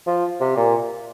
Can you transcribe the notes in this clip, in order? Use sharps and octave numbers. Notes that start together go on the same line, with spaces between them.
F3
C3
A#2